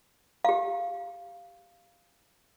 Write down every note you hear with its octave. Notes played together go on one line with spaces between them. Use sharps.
G4 F5